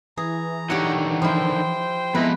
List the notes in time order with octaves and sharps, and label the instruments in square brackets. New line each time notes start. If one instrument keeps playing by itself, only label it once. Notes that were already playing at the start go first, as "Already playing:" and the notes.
[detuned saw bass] E3 [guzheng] G#4 [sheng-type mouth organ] A#5
[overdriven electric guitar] D3 D#3 [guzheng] G4 C#5 F#5
[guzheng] F3 E4 [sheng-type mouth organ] C5 G5
[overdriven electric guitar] F2 G#3 [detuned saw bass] B3 [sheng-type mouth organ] E4 A#5 [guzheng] B4